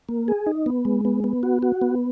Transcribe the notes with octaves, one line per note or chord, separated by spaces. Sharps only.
A#3
G#4
D#4
B3
G#3
B3
B3
F#4
F#4
B3